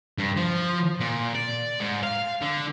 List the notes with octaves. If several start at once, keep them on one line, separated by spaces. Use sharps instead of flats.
G2
F3
A#2
D5
G#2
F5
D3